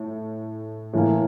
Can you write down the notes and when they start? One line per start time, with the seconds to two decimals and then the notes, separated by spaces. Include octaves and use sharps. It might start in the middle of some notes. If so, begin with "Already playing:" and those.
Already playing: A2
0.93 A2 E3 A#3